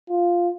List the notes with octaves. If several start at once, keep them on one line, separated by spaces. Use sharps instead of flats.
F4